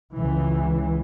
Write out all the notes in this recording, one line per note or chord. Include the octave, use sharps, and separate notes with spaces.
C#2 E3